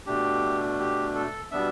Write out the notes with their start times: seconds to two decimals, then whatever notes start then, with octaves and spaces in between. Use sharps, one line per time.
0.06 B2 A3 D4 G4
0.79 G4
1.15 A4
1.51 B2 G3 B3 D4 E5